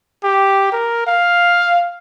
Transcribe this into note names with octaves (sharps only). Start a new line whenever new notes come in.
G4
A#4
F5